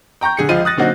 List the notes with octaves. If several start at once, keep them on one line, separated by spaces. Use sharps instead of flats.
G5 A#5 C#6 G6
D3 G#4 C#7
C#2 F3 G#3 F4 G#4 D#7
D#6 F#6 A6 A#6
D3 F#3 A#3 C4 D#4 F#4